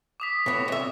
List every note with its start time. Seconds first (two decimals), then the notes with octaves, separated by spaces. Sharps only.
0.20 D6 D#6 B6
0.46 A2 B3
0.68 C2 E5